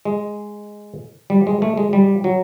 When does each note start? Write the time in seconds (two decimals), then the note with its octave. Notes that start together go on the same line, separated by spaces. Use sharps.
0.05 G#3
1.30 G3
1.47 G#3
1.62 A3
1.77 G#3
1.93 G3
2.24 F#3